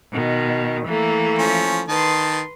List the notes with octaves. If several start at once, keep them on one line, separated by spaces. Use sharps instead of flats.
B2 D#3
E3 A3 A#3
F3 C#4
D#3 B4 A5 C6